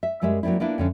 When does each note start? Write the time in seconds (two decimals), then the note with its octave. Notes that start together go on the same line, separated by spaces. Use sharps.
0.03 E5
0.22 F#2 G3 G#3 A#4 E5
0.43 F#3 A#3 C4 D4 E4
0.60 A#3 B3 D4 E4 F4
0.78 F2 D3 C#4